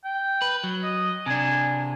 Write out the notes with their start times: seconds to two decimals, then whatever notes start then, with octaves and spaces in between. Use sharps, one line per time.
0.05 G5
0.42 B4
0.64 F#3
0.83 D#5
1.26 C3 D4 G#5